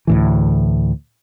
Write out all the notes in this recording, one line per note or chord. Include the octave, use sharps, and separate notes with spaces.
D2 A2 E3